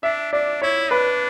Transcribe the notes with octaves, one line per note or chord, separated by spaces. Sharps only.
D4 E5
D4 D5
E4 C#5
D4 B4